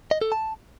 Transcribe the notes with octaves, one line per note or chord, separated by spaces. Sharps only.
D#5
A4
A5